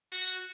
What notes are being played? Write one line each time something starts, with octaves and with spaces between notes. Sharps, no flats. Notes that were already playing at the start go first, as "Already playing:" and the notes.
F#4